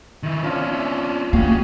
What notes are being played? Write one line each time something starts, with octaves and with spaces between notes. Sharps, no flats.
D#3 E4
F3 C#4 D4 F4 E5
A#3 C#4 F#4 G4 F5